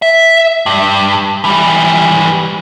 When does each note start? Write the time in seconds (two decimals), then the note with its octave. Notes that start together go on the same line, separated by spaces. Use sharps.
0.02 E5
0.66 G2
1.45 E3 G3